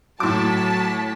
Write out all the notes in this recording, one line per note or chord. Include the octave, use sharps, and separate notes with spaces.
A2 F#3 A5 D6 B6